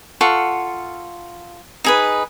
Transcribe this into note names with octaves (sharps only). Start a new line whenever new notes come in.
F4 A4 F#5 C#6
D#4 G#4 B4